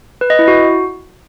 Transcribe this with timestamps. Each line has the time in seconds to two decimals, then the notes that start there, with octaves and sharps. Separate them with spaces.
0.21 B4
0.30 D#5
0.39 E4
0.48 F#4